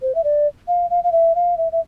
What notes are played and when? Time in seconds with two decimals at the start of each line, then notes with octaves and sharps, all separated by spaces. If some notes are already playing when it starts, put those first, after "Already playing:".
0.02 C5
0.15 E5
0.24 D5
0.68 F5
0.90 F5
1.04 F5
1.12 E5
1.35 F5
1.57 E5
1.72 E5